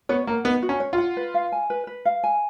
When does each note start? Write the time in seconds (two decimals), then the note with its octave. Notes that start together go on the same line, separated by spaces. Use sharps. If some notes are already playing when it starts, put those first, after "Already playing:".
0.09 B3 C#5
0.27 A#3 F#5
0.44 B3 D#4
0.62 F#4
0.69 C#4
0.80 C#5
0.93 F4
0.98 F#5
1.17 B4
1.34 F5
1.52 G#5
1.70 B4
1.87 B4
2.05 F5
2.24 G#5